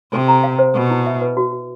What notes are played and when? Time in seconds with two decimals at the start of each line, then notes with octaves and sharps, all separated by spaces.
0.12 C3 A4
0.28 A#5
0.44 F5
0.59 C5
0.74 B2 A4
0.90 E4
1.06 E5
1.22 B4
1.37 F#4
1.52 F#4